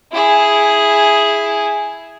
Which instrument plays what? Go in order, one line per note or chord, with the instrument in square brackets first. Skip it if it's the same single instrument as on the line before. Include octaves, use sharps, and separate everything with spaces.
[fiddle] E4 G#4